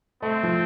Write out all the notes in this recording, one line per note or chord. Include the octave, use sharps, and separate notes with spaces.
A3 C4
F3